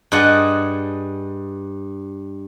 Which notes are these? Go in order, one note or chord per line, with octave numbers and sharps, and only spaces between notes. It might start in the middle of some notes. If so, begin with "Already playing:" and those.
G2 G#4 D#5 F#5 G#5 A5